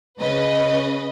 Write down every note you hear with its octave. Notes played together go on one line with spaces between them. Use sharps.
C#3 B4 D#5